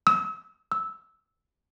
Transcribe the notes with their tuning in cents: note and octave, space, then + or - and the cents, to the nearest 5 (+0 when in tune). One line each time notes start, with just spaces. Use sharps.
E6 -35
E6 -10